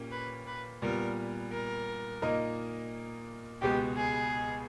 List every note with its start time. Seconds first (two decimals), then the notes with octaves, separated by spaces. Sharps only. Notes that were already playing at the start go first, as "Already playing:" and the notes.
Already playing: A#2 A#3 C#4 G4
0.12 B4
0.47 B4
0.82 A#2 G3 B3 A#4
1.52 A#4
2.22 A#2 A#3 D#4 A#4 D#5
3.62 C#2 B2 G#3 B3 G4
3.97 G#4